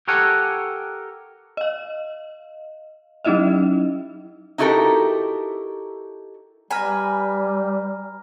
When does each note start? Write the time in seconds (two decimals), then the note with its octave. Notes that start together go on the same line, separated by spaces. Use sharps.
0.08 G4 A4 A#4 C#5 F#5 G#5
1.57 D#5 F5
3.25 F#3 C#4 D#4 E4 D#5 E5
4.58 D#4 E4 F#4 G4 A4 A#4
6.71 G3 B4 G#5 A#5 F6 A#6